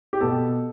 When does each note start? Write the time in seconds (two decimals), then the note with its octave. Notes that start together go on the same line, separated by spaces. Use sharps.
0.13 G4
0.20 B2 B3 A4